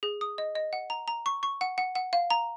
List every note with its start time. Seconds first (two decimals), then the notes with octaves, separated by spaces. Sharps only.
0.03 G#4
0.21 D#6
0.38 D#5
0.55 D#5
0.73 F#5
0.90 A#5
1.08 A#5
1.26 C#6
1.43 C#6
1.61 F#5
1.78 F#5
1.95 F#5
2.13 F5
2.30 A#5